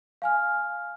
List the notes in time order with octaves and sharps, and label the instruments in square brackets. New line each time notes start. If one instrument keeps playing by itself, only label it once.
[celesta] F5 G#5 F6